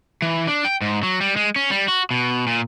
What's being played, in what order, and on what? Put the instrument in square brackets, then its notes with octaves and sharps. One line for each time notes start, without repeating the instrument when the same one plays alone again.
[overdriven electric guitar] E3
D4
G5
G#2
F#3
G3
G#3
C#4
G3
F#4
B2
A#2